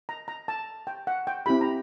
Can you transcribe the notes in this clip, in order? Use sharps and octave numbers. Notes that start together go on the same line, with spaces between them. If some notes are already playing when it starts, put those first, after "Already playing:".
A#5
A#5
A5
G5
F#5
G5
C4 E4 G4 B5
A#5